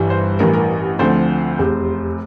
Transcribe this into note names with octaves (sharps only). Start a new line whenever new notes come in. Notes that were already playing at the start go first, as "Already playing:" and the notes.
Already playing: G1 G2 E3 G3
C5
A1 G2 E3 A#4
A#4
D2 D3 F3 C4 C5
F1 E2 C3